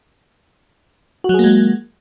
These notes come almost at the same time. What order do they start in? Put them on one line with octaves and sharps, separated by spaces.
F#4 F#3 G#4 A#3 G#3